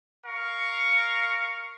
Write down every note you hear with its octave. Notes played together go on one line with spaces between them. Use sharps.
A#4 F5 C#6